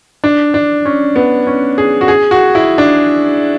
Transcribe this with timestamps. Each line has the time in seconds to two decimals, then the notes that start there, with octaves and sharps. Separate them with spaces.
0.24 D4
0.54 D4
0.85 C#4
1.16 B3
1.47 C#4
1.78 G#4
2.01 F#4
2.08 G#4
2.31 F#4
2.55 E4
2.78 D4